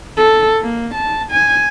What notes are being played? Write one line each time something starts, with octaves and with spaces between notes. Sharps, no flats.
A4
A#3
A5
G#5